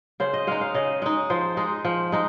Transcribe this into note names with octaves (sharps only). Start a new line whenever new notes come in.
C#3 C5
D#5
G#3 D#4 F5
F5
C#3 D#5
G#3 D#4
F3 C5
G#3 D#4
F3
G#3 D#4